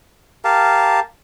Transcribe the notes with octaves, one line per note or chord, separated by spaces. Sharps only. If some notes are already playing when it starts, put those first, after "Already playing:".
G4 A#4 F5 A5